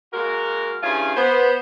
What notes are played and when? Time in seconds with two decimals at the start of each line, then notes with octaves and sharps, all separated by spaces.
0.13 G#3 A#3 F#4 A#4
0.83 G2 C#4 E4 F4 G#4 G#5
1.16 B3 C5